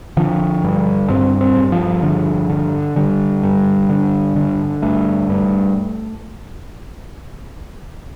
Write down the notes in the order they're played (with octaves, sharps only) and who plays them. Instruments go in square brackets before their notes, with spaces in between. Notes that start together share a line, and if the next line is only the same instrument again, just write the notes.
[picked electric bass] D3 F3
G2
G2 C4
C4
G2
F3
D3
D3
D3 G3
G2
D3
D3
G2 A3
G2